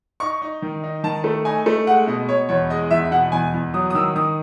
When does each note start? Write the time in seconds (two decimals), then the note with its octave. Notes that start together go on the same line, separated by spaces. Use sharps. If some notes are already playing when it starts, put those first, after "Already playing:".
0.20 D#4 C#6
0.42 D#4
0.62 D#3
0.83 D#4
1.04 D#3 A5
1.24 A3
1.45 D#4 G#5
1.66 A3
1.87 G#3 F#5
2.07 B2 D#5
2.29 B2 C#5
2.49 E2 C#5
2.70 G#3 D#5
2.91 E2 E5
3.11 B2 F#5
3.32 E2 G#5
3.54 E2
3.74 F#3 D#6
3.90 D#6
3.94 D#3 E6
4.16 D#3 D#6